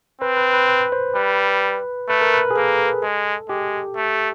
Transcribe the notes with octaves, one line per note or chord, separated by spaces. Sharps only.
C4 B4
B4
B4
B4
C5
G3 B4
A3 B4
A#4
B4
G#4
A#3 A4
G#3
G#3 G4
A3